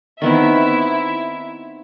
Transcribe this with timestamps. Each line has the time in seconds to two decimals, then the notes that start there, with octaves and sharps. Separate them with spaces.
0.22 D#3 B3 C4 E4 E5